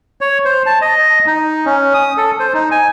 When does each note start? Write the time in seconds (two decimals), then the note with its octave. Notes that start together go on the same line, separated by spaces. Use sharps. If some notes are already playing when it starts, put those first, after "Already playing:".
0.21 C#5
0.45 C5
0.66 A5
0.81 D#5
1.27 D#4
1.66 C#4
1.94 D#6
2.17 A4
2.39 C5
2.54 D#4
2.71 G#5